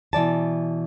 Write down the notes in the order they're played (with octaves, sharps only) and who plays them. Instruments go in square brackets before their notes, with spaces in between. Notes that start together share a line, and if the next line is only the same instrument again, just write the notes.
[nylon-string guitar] B2 E3 D5 A5